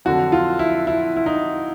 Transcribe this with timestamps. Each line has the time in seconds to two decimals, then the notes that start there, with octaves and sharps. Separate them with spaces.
0.05 F2 D3 F#3 F#4
0.32 F4
0.59 E4
0.87 E4
1.16 E4
1.26 D#4